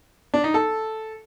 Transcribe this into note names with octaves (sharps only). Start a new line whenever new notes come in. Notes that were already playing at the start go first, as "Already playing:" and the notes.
D4
D#4
A4